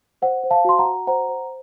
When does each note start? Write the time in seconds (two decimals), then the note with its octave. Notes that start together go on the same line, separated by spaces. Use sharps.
0.22 C5 F#5
0.43 C5
0.51 F5 A5
0.65 F#4 C6
0.79 F#5 A#5
0.86 F#4
1.07 C5 F#5 A#5
1.28 C5